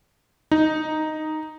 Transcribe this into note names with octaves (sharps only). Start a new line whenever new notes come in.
D#4